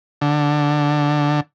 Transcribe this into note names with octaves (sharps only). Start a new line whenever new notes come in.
D3